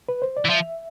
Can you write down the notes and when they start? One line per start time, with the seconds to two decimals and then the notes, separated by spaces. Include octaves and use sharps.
0.09 B4
0.22 C5
0.37 D5
0.45 E3
0.49 F3 E5